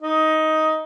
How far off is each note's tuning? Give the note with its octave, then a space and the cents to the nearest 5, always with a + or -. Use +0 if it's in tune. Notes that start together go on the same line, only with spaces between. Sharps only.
D#4 +10